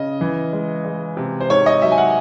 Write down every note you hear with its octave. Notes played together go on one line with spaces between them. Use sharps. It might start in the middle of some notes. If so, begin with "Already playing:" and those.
Already playing: C#3 D#5
E3
G#3
G#3
C3
C5
G#2 C#5
D#5
F#3 E5
G#5
F#5